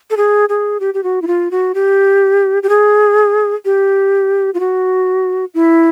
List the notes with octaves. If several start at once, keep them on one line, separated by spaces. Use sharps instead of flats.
A4
G#4
G#4
G4
G4
F#4
E4
F4
F#4
G4
G4
G#4
G4
F4
F#4
E4